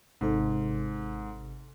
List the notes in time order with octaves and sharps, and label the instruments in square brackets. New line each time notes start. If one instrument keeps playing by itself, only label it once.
[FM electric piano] G#1 C3 A4 [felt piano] G#2